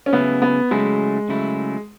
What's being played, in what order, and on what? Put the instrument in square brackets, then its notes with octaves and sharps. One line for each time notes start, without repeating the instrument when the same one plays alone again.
[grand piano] C#4
[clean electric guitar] C#3 F#3 A3 E4 [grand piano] B3
[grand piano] B3
[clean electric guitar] C#3 F#3 A3 E4 [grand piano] G#3
[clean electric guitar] C#3 F#3 A3 E4